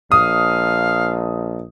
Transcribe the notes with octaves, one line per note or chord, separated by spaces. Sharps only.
A#1 F5 D#6